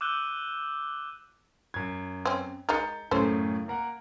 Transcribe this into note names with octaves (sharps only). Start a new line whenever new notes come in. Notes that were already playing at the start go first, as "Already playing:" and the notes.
D6 E6 F#6 G6 D#7 G7
F#2 G#6
C4 C#4
G#3 D#4 A#4 G6 A6 C#7
F#2 A2 C#3 C#4 A4 C5
A#3 A#4 F#5